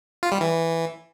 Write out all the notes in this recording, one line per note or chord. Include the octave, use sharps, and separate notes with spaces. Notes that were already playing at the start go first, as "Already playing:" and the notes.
F4
G3
E3